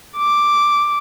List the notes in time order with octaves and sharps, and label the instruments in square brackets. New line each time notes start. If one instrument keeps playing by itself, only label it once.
[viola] D6